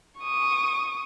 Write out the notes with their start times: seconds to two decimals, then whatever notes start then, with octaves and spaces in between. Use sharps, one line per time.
0.21 C#6 D#6